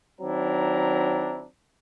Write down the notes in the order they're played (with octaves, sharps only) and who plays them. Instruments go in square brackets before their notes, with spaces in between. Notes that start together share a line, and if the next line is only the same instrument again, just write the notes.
[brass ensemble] D#3 F#3 C4 D4 E4 A#5